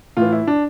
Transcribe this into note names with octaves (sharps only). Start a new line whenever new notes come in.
A2 E3 F4
E4
D4